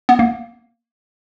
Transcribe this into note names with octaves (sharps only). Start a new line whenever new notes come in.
B3
A#3